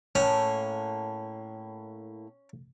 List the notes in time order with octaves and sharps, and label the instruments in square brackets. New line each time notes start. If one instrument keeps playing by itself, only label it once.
[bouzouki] A2 A#3 [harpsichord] C#4